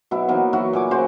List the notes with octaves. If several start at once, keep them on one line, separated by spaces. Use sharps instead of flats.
B2 F#3 E4
E3 A#3 B3 D#4
F#3 E4 F#4
A#2 G#5 D6
C#3 F#4 C5